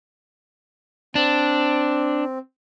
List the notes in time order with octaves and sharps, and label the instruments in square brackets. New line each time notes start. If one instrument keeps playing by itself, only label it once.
[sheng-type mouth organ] C4 [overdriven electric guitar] D4